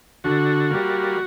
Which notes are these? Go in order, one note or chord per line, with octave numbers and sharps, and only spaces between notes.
D3 F#4
G3 A#3